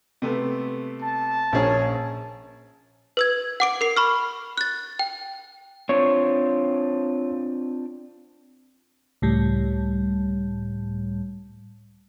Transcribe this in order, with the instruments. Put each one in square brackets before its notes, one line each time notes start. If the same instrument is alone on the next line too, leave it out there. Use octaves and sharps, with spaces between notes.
[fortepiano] C3 A3 B3
[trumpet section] A5
[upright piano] A#1 C#5 [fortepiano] C#4 G#4 A#4
[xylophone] B4 E6 G#6
F#5 D6 D7
A#4 C7
B5 C#6 F6
F#6 A6
G5
[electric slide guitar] C4 D4 F4 [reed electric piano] C#5
[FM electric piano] C#2 A2 G3